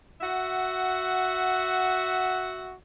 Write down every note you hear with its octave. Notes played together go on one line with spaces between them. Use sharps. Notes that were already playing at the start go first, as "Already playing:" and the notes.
F#4 E5 F#5